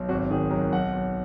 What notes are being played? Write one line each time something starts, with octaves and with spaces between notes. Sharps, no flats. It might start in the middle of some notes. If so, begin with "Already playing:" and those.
Already playing: B1
G#1 F#4
D#3 G#4
F#3 A#4
B1 F#5
B1